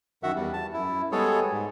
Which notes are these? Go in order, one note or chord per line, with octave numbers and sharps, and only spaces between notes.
F#2 D#3 F#4 E5 F#5
E2 G3
A5
F#2 E4
G3 G#3 B3 G#4 A4 C#5
G#2